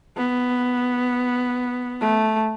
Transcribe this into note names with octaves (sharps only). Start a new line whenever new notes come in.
B3
A3